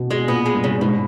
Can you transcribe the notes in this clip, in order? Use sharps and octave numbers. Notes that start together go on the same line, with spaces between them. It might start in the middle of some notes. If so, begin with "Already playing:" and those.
Already playing: B2
B2 G#3
A#2 B3
G#3
G2
C#3
G#2 B2